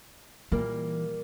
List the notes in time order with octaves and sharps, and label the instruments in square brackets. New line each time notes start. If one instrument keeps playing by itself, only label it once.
[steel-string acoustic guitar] A#2 G3 A#3 [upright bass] E3